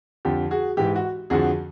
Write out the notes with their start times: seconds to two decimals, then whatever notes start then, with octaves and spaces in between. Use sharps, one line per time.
0.25 F2 D3 F3 G4
0.51 F#4 G#4
0.77 G#2 E3 G4
0.96 F#4
1.30 F2 D3 F3 F#4 G#4